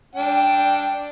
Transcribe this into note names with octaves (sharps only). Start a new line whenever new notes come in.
D4 G5